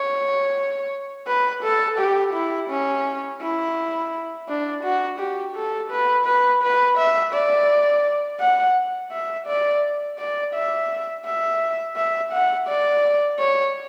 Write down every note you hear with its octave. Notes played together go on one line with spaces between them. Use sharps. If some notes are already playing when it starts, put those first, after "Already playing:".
Already playing: C#5
B4
A4
G4
E4
C#4
E4
D4
F#4
G4
A4
B4
B4
B4
E5
D5
F#5
E5
D5
D5
E5
E5
E5
F#5
D5
C#5